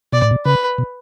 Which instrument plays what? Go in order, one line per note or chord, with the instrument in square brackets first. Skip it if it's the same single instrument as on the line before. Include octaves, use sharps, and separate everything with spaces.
[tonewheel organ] B2 [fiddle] D5
[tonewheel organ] A2
B2
[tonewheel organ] C#3 [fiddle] B4
[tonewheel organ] B2